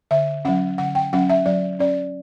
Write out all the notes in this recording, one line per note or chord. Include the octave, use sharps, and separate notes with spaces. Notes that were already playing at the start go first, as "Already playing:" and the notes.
D3 E5
F#3 C#4 F#5
D3 F#5
G5
F#3 C#4 F#5
E5
F#3 D5
C#4 D5